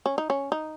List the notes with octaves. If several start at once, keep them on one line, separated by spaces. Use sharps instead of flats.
C#4
D#4
C#4
D#4